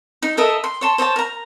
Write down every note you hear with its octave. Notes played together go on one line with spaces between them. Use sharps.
D#4
A4 A#4 D#5 E5
C6
C#5 A5 C6
C5 C#5 D#5 A5
A#4 A#5